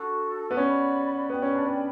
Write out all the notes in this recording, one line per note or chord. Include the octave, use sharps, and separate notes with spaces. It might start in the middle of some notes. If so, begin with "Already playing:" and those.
Already playing: D4 F#4 A4
B3
C#4 G4 D5 F#5 B5
B3 G4 D5 G5 B5
C#4
D4
C#4